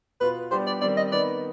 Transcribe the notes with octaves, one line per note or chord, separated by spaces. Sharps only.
B2 B3 F4 B4
G3 B3 D4 G4 C5
D5
D#3 G3 C4 D5
D#5
D#3 B3 D#4 B4 D5